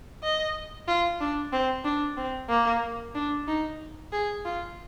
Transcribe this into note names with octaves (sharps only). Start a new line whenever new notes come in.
D#5
F4
D4
C4
D4
C4
A#3
D4
D#4
G#4
F4